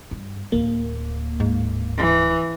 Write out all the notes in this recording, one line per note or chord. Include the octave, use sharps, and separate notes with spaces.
G2
D1 D2 A#3
G#2
E3